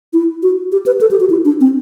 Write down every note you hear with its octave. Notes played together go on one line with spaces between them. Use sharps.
E4
F#4
G4
B4
A4
G4
F#4
E4
D4
C4